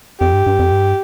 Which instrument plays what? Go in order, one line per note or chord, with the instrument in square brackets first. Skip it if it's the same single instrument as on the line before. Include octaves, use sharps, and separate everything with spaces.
[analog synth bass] F2 [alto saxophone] G4
[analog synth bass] G2
G2
F2
G2